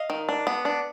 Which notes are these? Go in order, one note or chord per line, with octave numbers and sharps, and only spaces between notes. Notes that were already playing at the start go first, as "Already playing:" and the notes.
Already playing: D#5 F5
D#3
D4
B3
D4